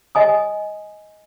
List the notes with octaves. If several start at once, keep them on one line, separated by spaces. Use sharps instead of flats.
D#5 G#5 D#6